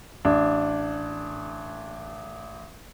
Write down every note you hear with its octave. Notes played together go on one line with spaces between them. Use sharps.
A1 D4